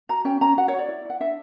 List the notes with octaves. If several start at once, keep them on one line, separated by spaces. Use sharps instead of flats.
F#4 A#5
C#4 G5
C#4 A#5
F#4 F#5
C#5
F#4
D5
E4
E4 F#5
D4 E5